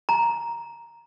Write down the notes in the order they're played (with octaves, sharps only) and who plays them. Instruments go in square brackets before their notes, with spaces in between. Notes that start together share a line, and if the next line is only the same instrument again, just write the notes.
[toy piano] A#5